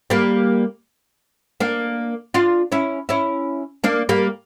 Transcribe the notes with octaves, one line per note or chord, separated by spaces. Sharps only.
G3 A#3
A#3 D4
D4 F4
C#4 E4
C#4 E4
A#3 D4
G3 A#3